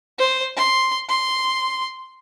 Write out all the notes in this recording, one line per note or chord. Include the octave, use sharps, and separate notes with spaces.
C5
C6
C6